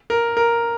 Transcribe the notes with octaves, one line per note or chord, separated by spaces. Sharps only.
A#4
A#4